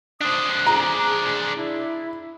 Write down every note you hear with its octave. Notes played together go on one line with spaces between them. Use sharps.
D4 C5 D#6
G#4 A#5
E4